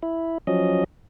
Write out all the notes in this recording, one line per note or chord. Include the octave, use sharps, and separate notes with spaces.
E4
F3 F#3 C#4 D#5